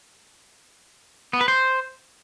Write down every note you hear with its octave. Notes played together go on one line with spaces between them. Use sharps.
B3
B4
C5